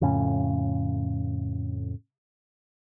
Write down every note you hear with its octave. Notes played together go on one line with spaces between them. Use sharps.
F2 A2 C#3 C#4